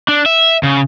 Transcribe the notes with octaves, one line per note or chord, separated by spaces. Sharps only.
D4
E5
C#3